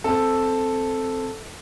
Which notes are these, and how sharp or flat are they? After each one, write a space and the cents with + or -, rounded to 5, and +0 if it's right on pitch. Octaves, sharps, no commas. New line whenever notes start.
C4 +0 A4 +0